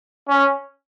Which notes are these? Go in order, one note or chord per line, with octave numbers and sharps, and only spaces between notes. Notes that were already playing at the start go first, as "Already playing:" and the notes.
C#4